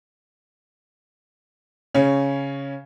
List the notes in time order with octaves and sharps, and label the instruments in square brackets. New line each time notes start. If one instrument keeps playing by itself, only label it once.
[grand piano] C#3 C#4